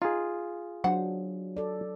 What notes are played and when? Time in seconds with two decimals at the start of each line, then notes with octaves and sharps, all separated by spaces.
0.02 D#4 F4 G#4
0.84 F#3 D4 C5 F#5
1.57 A4 D5